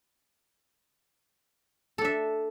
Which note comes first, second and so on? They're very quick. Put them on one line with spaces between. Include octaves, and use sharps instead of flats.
A4 D4 E5